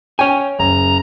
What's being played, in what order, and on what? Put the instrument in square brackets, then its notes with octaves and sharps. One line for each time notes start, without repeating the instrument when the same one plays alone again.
[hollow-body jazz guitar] C#5 G#5 [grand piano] G5
[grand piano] F#1 [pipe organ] A#5